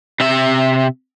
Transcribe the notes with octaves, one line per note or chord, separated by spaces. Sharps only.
C3 E5